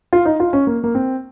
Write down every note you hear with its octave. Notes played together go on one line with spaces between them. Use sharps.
F4
D#4
F4
C#4
A#3
A#3
C4